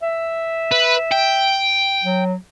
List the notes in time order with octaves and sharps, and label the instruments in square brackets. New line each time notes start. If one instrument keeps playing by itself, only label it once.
[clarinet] E5
[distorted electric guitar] B4
G5
[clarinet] F#3